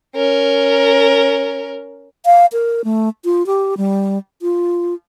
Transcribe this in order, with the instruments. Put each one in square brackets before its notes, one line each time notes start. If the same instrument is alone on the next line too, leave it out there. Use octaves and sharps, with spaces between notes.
[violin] C#4 A#4
[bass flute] F5
A#4
A3
F4
G4
G3
F4